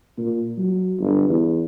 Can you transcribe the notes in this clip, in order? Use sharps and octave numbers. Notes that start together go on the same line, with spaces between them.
A#2
F#3
G1
E2